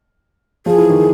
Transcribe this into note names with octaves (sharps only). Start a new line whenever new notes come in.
F3 G#4
E3
D#3